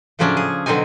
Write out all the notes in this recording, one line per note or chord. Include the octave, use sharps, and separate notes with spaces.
A2 C#3 F3 F#3 C#4 D4
G#4
B2 D3 F#3 C4 D#4 G#5